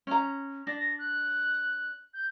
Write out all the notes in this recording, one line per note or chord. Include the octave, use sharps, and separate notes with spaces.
C#4 A#5
D4 A#6
F#6
G6